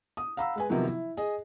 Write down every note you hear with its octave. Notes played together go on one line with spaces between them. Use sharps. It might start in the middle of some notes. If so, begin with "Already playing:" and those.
D#6
F5 F#5 A#5 B5 E6
G#3 B4 G#5
C3 D#3 F3 F#3 B3
E4
G#4 D#5